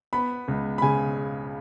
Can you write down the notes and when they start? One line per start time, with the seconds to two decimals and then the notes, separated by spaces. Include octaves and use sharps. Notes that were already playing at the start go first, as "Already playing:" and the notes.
0.13 B3 B5
0.48 C#2
0.78 B5
0.82 C#3 G#5